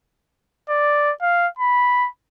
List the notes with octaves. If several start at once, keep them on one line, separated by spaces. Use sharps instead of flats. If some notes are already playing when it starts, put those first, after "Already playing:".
D5
F5
B5